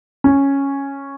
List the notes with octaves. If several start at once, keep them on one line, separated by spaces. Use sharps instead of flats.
C#4